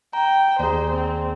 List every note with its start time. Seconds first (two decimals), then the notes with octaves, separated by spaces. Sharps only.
0.13 G5 A#5
0.59 D#2 G#4 C5 D5 A#5
0.93 C4